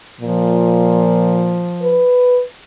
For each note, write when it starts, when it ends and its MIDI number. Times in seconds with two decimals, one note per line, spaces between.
0.21 1.73 46
0.21 2.04 53
1.82 2.42 71